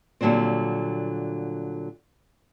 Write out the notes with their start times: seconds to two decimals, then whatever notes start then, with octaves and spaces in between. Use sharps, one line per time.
0.21 A#2 D3 F#3 G3 C4